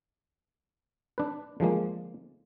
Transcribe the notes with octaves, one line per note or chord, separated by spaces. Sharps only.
D4 B4
D3 F3 G#3 A#3